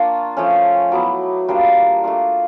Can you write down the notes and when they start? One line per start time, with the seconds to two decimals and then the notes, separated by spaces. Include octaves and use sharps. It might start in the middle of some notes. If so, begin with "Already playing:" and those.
Already playing: A#3 D4 F4 C#6
0.37 F3 A3 C#4
0.92 F#3 B3 E4 D6
1.49 G3 A#3 D4 F4
2.04 A3 D4 F4 D6